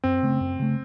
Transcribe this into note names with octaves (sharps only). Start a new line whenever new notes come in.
F#2 C4
C#3 A3
F#2
C#3 A3